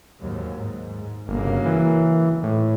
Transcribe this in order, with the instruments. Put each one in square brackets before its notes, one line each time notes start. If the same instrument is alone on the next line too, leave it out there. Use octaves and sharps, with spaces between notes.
[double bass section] D#2 G#2 F#3
G#2
[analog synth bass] G1 [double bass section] C#3 F#3 A#3
[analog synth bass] E3
[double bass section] G#1
[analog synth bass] A2